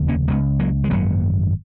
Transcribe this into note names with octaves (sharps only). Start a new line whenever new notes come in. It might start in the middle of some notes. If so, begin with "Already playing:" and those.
Already playing: F1 D#2 C#3
A#3 C#4
C#2 C#3 G#3 B3
F#3 A#3
G#3
G#1 F#2 C#3 F#3 A#3